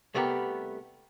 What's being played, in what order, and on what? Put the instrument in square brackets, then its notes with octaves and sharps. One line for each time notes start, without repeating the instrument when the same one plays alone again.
[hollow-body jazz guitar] C2 A3 B3 G4 A#4